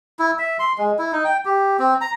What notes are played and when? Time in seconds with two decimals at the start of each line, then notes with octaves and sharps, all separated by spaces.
0.19 E4
0.39 E5
0.59 C6
0.78 G#3
0.99 E4
1.13 D#4
1.25 G5
1.45 G4
1.79 C4
2.01 A#5